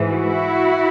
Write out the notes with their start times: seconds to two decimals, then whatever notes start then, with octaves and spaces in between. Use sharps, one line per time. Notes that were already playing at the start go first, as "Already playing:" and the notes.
Already playing: G#2 E3
0.11 E4 F#4